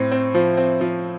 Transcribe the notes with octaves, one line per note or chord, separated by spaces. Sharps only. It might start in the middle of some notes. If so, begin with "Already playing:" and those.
Already playing: A2 C4
C4
F3
C4
F3